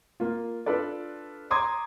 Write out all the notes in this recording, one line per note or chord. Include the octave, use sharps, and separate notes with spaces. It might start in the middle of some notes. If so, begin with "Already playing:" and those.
A#3 F4
D4 F4 A4 B4 D5
A#5 C6 D6 D#6 G#6